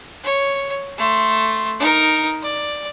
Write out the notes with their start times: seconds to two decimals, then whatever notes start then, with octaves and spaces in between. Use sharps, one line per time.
0.23 C#5
0.98 A3 C6
1.79 D#4 A#4
2.42 D5